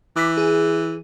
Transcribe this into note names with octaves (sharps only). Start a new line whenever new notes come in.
E3 D6 B6
G#4